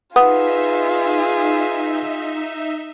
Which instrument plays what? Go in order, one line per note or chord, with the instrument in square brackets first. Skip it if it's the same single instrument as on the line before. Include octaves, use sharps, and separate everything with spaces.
[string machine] D#4 E5 [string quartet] F4 G#4 [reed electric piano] B4 [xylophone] F#5 D#6